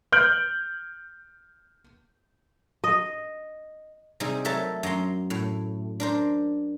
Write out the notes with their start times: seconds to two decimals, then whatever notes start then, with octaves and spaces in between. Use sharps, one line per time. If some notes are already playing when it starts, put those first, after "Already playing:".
0.12 F6 G6 D7 F#7
2.84 D#5
4.20 C3 G3 D#4 G#4
4.45 F#3 A3 A#4 E5 A5
4.83 F#2 A#5 C6
5.30 A2
6.00 D4 A#4 C5